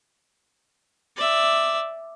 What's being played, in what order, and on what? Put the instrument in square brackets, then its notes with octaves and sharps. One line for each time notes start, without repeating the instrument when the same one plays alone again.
[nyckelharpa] D5 E5